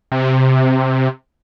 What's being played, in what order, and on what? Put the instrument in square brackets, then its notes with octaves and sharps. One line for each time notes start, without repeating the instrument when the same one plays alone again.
[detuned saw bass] C3